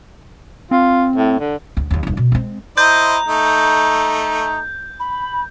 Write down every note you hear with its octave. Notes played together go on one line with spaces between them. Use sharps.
C4 F4
A2
D3
D2 D3
D#2 F3
D#1 D#4
B2
G#3 C4
E4 C5 D#5 A#5 G6
A3 D#4
B5